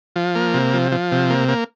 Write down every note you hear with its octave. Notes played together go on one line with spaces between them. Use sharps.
F3
A#3
C3
F3
F3
C3
A#3
A#3